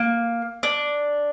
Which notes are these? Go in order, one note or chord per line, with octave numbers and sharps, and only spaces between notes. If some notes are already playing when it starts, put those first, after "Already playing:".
Already playing: A#3
D4